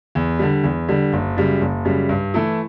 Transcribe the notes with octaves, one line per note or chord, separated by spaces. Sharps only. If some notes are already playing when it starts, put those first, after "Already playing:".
E2
D3 G3
E2
D3 G3
F#1
F#2 C#3 G3
F#1
F#2 C#3 G3
G2
E3 A3 E4